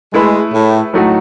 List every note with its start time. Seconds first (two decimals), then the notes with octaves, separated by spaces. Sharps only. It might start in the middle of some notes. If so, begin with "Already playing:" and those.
0.14 G#3 A3 E4 G#4 B4
0.53 A2
0.93 A2 F#3 A3 D#4 F#4